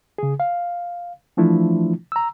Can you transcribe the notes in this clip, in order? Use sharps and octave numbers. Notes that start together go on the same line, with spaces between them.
C#3 G#4
F5
E3 F3 A3 D4 E4 F4
A#5 E6